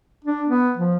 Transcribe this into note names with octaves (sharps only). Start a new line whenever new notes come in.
D4
B3
F3